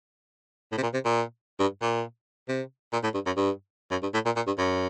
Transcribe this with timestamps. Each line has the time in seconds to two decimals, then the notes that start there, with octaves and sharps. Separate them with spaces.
0.72 A2
0.78 C3
0.83 A#2
0.94 C3
1.05 A#2
1.60 G2
1.82 A#2
2.49 C3
2.93 A#2
3.03 A2
3.14 G2
3.26 F#2
3.37 G2
3.91 F#2
4.03 G2
4.14 A2
4.25 A#2
4.36 A#2
4.47 G2
4.58 F#2